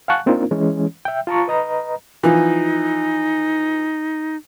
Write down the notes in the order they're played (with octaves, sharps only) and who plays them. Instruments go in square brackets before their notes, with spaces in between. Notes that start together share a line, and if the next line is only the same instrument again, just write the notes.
[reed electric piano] F5 F#5 G#5 A5 C#6 F#6
A#3 C4 D4 D#4 F4 A#4
E3 G#3 C#4
E5 G5
F4 A5 A#5 C#6
B4 D#5 A#5
[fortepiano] E3 F3 [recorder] D#4